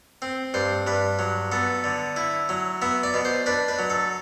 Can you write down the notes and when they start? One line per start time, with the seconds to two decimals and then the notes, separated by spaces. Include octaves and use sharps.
0.22 C4
0.54 G2 C5
0.87 G2 B4
1.19 F#3
1.52 B3 A4
1.84 D3
2.16 E4
2.49 F#3
2.82 B3 E5
3.03 D5
3.14 B2
3.25 C5
3.46 D4 B4
3.68 B4
3.79 F#3
3.90 A4